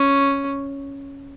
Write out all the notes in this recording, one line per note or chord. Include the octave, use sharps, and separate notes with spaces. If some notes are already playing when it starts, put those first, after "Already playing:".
Already playing: C#4